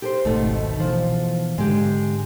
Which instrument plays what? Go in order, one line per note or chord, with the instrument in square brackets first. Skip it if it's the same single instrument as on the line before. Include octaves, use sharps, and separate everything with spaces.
[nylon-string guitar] G4 A4 C5
[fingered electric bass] G#1 C#2 [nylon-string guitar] B2 D#3 A3
[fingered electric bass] B2 E3 [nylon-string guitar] F3
[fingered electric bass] G#2 D3 [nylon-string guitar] G#3 G4